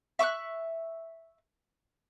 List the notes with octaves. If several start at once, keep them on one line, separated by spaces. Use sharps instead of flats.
E5 C#6 D6 F#6